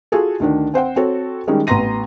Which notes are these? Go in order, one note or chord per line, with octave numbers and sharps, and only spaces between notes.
F4 F#4 G#4 A4
D2 D#3 D4
C4 C5 F#5 G5
C4 F#4 A4 C#5
D#3 G3 G#3 C#4 D#4
A1 B3 A#5 C6 A#6 D#7